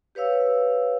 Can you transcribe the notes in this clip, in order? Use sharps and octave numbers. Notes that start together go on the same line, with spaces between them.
G4 B4 C#5 F5 E6